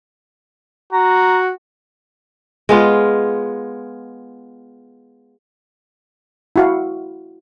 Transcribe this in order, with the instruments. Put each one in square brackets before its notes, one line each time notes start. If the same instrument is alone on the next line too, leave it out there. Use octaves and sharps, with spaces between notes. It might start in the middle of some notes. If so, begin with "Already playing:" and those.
[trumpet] F#4 [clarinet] A#5
[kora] G#3 B3 F4
[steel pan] E4 F#4 F5